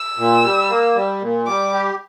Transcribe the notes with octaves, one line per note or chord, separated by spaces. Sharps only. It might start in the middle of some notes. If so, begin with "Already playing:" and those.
Already playing: E6
A#2
G3
A#3
G3
A#2
G3 D6
G4